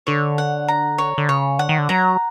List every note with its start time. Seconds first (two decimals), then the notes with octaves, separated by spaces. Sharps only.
0.07 D3 C#5
0.38 F#5
0.68 A#5
0.98 C#5
1.18 D3
1.29 C#3 C#5
1.59 D3 F#5
1.69 D#3
1.78 D3
1.89 F#3 A#5